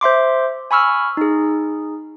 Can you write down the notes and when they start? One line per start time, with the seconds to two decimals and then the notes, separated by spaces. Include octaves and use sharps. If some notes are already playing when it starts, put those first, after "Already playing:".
0.01 C5 E5 C6 D6
0.71 G#5 B5 C#6 E6 F6
1.17 D#4 G#4